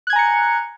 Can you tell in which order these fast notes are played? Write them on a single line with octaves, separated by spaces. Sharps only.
F#6 G#6 G#5 A#5 C#7